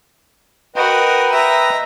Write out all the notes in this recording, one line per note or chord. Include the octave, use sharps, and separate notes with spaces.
F#4 A#4 B4 D#5 G5
E5 A#5